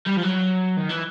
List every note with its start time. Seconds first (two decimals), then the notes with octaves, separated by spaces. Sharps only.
0.06 G3
0.16 F3
0.23 F#3
0.77 D#3
0.90 E3